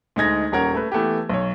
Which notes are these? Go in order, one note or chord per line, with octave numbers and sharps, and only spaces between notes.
D2 G#3 D#4 G#6 A#6
D#1 C#4 A#4 F#5 G#6
A3 B4
E3 A3 B3 G4
B1 C#5